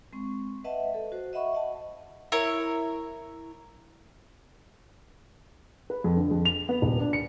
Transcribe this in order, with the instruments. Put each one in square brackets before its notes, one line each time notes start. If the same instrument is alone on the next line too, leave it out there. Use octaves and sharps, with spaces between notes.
[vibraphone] G#3 C4 C#6
B4 D#5 E5 F#5 A5
A4
F#4 C5
D#5 E5 F#5 B5 C#6
D#5 F#5 A5
[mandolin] E4 A#4 C#5
[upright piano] B4
F2
D3
F2
F7
B3
D#1
D4
C#7